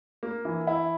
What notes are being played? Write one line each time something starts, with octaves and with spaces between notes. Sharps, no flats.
A#3
E3
E4